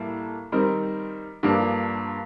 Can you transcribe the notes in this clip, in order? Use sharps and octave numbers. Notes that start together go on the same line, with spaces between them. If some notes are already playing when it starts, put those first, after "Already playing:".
Already playing: A2 G3 A#3 A4
D#3 G3 C4 D#4 A#4
G2 D3 F3 A#3 D4